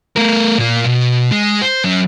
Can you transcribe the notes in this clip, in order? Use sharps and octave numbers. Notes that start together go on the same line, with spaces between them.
A3 A#4
A#2 F4
B2
G#3
C5
F#3 C#4